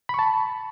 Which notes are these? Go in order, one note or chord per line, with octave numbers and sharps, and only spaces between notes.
A5 B5 C#6